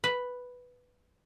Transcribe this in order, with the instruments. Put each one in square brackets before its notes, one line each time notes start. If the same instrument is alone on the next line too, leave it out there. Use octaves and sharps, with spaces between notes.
[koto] B4